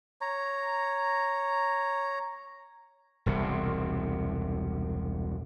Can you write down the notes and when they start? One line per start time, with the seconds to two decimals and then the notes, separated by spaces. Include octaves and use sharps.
0.21 C#5 A#5
3.26 E1 C2 C3